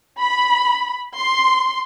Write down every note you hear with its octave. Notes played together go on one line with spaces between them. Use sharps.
B5
C6